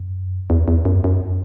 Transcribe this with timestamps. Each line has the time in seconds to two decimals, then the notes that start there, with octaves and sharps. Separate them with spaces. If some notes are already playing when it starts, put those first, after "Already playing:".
Already playing: F#2
0.50 E2
0.68 E2
0.85 F#2
1.04 F#2